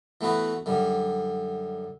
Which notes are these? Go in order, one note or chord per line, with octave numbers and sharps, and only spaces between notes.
E3 A3 B3 F#4 B4
F#2 D3 G3